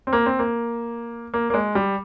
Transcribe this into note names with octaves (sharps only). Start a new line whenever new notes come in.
C4
A#3
C4
A#3
A#3
A#3
G#3
G3